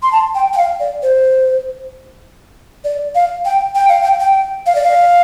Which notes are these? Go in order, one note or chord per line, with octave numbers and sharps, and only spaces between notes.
C6
A5
G5
G5
F5
D5
C5
D5
F5
G5
G5
F5
G5
G5
F5
D5
F5